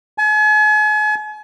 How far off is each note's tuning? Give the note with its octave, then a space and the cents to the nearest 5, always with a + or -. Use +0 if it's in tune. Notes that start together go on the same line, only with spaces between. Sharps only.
G#5 +40